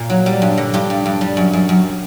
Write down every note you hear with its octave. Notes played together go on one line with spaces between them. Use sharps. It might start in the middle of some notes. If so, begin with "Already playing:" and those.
Already playing: A#2
F#3
G3
G2
D3
G2 G4
G2
G2
G3
F#2
F#2
F#2